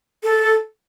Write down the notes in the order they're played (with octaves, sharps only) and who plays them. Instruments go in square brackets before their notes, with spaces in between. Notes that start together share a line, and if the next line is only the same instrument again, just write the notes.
[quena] A4